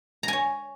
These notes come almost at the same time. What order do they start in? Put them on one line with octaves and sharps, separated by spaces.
A#5 G#5 C#5